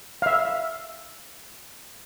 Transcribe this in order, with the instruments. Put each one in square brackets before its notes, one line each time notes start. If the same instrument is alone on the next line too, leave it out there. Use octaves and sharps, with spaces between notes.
[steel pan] E5 F5